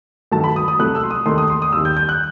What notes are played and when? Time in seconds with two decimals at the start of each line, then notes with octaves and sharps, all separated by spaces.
0.32 G2 D#3 F#3 A3 A5
0.44 B5
0.56 D#6
0.68 D#6
0.79 C2 C3 F#3 A3 F#6
0.95 E6
1.03 C6
1.11 D#6
1.26 D#2 D#3 A3 C6
1.38 D#6
1.50 C6
1.62 D#6
1.72 D#2 D#3 G3 E6
1.85 G6
1.97 G6
2.09 F#6